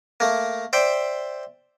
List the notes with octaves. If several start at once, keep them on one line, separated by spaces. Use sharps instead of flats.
A3 A#3
C5 D5 E5 G5